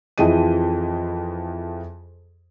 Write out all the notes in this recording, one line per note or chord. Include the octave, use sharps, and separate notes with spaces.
F2 E3 G#4 D#5 D#7